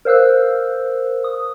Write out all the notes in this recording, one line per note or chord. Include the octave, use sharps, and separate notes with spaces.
A#4 C5 F5 E6 F#6
D#6